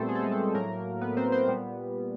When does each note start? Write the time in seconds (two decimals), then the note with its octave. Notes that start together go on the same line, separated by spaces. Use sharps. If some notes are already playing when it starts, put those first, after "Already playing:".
Already playing: A#2 G3 A3 B3 C4 A4 C5
0.09 G#4
0.15 A4
0.23 G#3 G#4
0.32 A3 A4
0.54 A2 F#3 A3 A#3 A#4
1.01 B3 B4
1.17 C4 C5
1.32 C4 C5
1.48 A#2 G3 B3